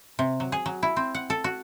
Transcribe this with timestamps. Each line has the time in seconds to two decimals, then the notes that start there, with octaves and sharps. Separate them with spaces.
0.19 C3
0.40 F#3
0.52 G#4
0.66 F#3
0.83 E4
0.96 C4
1.14 F#5
1.30 A4
1.44 F#4